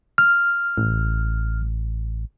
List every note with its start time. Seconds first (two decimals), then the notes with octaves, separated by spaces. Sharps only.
0.18 F6
0.78 A1